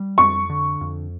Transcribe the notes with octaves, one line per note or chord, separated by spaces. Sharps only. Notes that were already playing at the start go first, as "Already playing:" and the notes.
Already playing: G3
F2 C#6
D3
F2